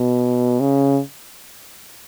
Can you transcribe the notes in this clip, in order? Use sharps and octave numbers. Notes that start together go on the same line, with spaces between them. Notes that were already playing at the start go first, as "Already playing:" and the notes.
Already playing: B2
C#3